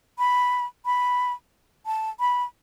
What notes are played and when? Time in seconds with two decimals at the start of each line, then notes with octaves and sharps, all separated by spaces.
0.18 B5
0.85 B5
1.86 A5
2.20 B5